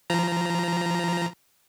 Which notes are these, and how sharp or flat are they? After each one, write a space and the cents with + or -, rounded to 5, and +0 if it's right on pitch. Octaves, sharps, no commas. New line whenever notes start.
F3 -20 A#5 +0